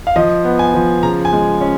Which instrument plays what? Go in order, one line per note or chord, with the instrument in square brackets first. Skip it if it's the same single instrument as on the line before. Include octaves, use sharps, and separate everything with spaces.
[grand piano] F5
F3 D#5
B3
G#5
F3
C#3 A#5
G#5
G#3
C#4